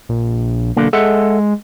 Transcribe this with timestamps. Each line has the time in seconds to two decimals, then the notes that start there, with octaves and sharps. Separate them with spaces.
0.09 A#1
0.77 B1 D3 A#3
0.93 G#3 A4 E5 F#5